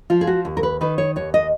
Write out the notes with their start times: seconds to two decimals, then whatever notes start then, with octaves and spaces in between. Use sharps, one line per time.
0.10 F3 F4
0.21 G#4
0.27 F#4
0.45 D#2
0.57 A#4
0.63 B4
0.81 D#3 B4
0.98 C#5
1.16 D#2 C#5
1.34 D#5